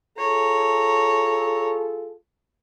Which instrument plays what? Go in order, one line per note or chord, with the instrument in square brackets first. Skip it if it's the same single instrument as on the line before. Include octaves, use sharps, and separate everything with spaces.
[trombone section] F4 G#4 A4 [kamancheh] C#5 A#5